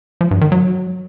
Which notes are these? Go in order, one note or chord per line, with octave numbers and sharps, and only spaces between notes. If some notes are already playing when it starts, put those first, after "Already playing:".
F3
G2
D#3
F#3